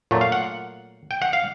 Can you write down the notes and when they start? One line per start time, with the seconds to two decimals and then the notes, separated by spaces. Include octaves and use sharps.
0.11 A#2 F#3 A3
0.21 F5
0.32 F#5
1.11 G5
1.22 F#5
1.33 F5